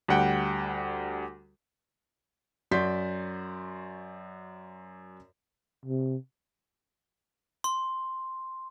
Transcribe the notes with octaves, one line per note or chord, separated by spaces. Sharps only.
D2 G3 F#5 G5
F#2 F#4 D5 C6 G6 B6
C3
C6